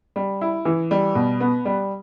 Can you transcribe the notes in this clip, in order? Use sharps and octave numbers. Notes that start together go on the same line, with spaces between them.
G3
E4
E3
G3
B2
B3
G3